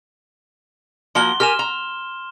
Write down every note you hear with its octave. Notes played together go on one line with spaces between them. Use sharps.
F3 A#3 F#4 C6 G7
G4 A#4 G#5 F6 E7
A#5